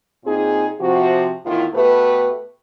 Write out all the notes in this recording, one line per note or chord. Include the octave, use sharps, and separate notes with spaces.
A#2 C4 D#4 G#4
C3 F3 F#4
E2 A2 D#3 E4 F4
B2 A3 G4 B4